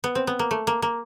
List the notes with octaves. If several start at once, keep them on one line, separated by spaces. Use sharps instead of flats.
B3
C4
B3
A#3
A3
A#3
A#3